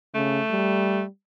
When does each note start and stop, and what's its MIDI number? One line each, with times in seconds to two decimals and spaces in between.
0.15 0.40 49
0.15 1.02 57
0.51 1.06 55